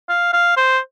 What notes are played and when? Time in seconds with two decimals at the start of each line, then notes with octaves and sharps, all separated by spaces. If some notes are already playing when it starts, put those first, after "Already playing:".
0.10 F5
0.33 F5
0.57 C5